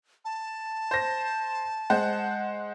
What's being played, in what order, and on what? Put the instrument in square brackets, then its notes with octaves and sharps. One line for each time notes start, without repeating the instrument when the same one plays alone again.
[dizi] A5
[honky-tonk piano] C5 A#6
G#3 C5 F#5